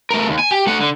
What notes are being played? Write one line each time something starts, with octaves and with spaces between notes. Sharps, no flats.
A3 A#4
D#2
G#5
G4
A3 F#5
D3